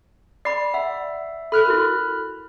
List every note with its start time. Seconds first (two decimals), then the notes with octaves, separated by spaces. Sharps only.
0.45 D5 B5 D6 C7
0.74 E5 F#5
1.52 A4 B5 F6 F#6
1.65 E4 F#4 A#4